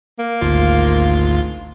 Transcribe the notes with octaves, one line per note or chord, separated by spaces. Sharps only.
A#3
G#1 D2 F4